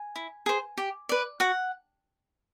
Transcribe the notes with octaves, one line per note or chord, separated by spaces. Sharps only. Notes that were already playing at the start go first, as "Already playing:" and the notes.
Already playing: G#5
E4
G#4 C5
G4
B4 D5
F#4 F#5